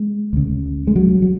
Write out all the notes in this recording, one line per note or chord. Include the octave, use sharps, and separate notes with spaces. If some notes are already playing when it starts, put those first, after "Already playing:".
Already playing: G#3
D2 C#3
G#3
F#3
F#3